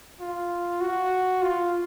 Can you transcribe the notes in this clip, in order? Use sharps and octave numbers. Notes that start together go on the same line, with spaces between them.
F4
F#4
F4